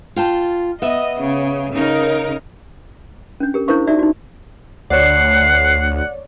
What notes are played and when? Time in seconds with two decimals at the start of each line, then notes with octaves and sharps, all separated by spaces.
0.16 F4 G5 A5
0.82 B3 D#5 E5
1.20 C#3
1.73 C#3 D#4 A#4
3.40 C#4 D4
3.54 G4 A#4
3.68 D4 E4 A#4 C5 F5 C#6
3.87 D#4 F#4 D5 E5
3.99 D#4 F#4
4.90 D2 C#5 D5 F#5 C7